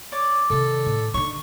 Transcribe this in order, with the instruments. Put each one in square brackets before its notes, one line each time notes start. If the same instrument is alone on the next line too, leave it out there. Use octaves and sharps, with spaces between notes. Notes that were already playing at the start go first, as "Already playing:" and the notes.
[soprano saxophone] C#5 [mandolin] D5
[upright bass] C3 D#3 [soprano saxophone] A4
[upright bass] A2
[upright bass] D3 D#4 [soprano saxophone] C#6